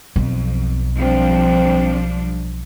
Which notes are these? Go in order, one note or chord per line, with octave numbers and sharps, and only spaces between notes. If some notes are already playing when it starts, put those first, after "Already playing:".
B1 F2
F3 G3 C4 D4